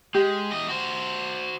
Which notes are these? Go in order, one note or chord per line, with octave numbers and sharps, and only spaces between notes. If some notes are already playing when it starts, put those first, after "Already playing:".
G#3 G4
E2 D#5
F#4 C5